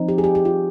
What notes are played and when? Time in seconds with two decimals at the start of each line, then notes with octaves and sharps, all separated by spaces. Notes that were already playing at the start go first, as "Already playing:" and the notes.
Already playing: F3 C4 D#4
0.08 G4
0.18 G#4
0.24 G4
0.35 G4
0.45 F4